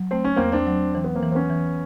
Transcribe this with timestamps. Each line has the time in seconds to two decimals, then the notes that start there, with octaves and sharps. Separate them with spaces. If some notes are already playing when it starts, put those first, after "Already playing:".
Already playing: F#3
0.11 A3 C4
0.25 C#4
0.36 E2 A#3 C4
0.52 C4 D4
0.67 F#3
0.94 E3 C4
1.04 B3
1.15 A#3 C4
1.22 E3
1.31 C4
1.35 B3 C#4
1.50 E3